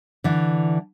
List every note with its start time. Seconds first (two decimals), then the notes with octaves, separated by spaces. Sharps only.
0.24 D3 E3